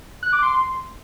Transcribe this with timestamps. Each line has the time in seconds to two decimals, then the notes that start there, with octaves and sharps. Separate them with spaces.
0.23 F#6
0.33 D6
0.42 C6